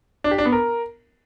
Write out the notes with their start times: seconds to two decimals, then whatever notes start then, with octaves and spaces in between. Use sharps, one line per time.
0.24 D4
0.31 G4
0.38 D4
0.45 B3
0.52 A#4